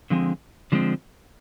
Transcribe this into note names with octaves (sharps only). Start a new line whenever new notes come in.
D3 F3 G#3 C4
D3 F3 G#3 C4